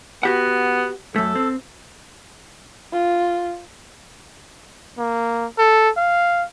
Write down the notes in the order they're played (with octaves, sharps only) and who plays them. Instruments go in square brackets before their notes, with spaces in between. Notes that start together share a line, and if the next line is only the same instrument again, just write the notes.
[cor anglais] B3 [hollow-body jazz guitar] F#4 G4 F#5
[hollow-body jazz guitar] F#2 A3 [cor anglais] A4
[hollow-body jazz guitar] C4
[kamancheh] F4
[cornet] A#3
A4
F5